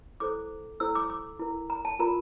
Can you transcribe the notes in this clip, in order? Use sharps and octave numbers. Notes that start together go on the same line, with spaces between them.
E4 A4 C5 D6
E4 A4 C5 E6
D6
D6
E4 A#4
A#5
A5
F4 A#4 A#5